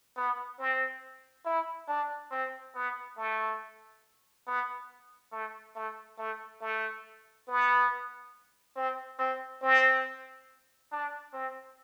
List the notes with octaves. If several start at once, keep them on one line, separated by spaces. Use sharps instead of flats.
B3
C4
E4
D4
C4
B3
A3
B3
A3
A3
A3
A3
B3
C4
C4
C4
D4
C4